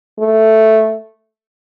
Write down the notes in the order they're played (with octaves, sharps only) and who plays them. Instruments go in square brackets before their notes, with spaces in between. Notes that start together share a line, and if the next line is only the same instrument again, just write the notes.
[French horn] A3